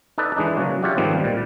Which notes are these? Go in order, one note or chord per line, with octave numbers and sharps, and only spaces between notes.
D#4 A4 B4 D5
E3 G#3 D4 D#4
C#3 F#3 A#3 F#4
F4 G4 C#5 D5 E5 F#5
G#2 D#3 F3 G3 B3 C4
A#2 G3